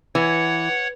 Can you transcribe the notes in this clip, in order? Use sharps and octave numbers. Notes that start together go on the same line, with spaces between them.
E3 C#5 F#5